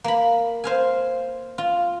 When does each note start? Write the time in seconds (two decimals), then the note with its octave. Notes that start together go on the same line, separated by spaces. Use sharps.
0.04 A#3 B5
0.64 C5 F5 G#5
1.58 F4